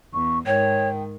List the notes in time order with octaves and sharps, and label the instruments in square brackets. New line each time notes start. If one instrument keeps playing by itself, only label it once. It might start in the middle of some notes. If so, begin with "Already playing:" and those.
[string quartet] E2 [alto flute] C#6
[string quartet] G#2 D#3 [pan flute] C#5 [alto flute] G5